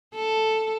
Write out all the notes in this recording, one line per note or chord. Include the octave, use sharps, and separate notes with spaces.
A4